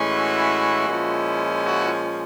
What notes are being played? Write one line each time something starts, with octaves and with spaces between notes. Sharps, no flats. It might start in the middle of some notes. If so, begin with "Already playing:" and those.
Already playing: A2 E3 G#3 C#4
E4 F#4
A#2 F3 G#3 C#4 E4
E4 F#4